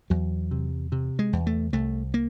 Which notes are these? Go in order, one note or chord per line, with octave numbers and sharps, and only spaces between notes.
E2 F#3
C3
C3
G#3
E2
A3
C2 A3
A#3